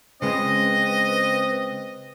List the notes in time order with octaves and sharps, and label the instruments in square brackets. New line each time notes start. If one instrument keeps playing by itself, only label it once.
[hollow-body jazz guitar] C#3 G#3 [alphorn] C4 [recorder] B4 [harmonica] D#5